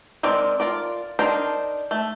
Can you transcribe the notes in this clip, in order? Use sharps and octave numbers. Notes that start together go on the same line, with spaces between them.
G#3 C4 A#4 D5
F4 A#4 D5
D4 D#4 A#4 C5
A3